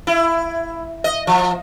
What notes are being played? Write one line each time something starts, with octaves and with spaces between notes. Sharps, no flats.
E4
D#5
F3